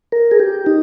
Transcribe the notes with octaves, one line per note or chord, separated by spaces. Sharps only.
A#4
G#4
G4
D#4